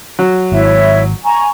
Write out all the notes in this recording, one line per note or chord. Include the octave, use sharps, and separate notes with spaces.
F#3
G#1 E4 C#5 E5
G#5 A#5 C#6